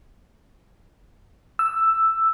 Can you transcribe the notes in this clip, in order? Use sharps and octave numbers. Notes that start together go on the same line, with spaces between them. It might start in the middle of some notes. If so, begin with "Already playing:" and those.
E6